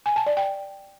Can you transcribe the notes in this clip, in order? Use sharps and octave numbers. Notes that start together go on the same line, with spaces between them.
G#5
A5
D5
G5